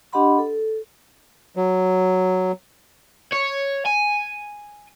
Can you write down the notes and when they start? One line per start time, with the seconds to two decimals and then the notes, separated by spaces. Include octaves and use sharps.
0.13 D4 G4 D#5 F#5 B5 C6
0.38 A4
1.56 F#3
3.32 C#5
3.86 G#5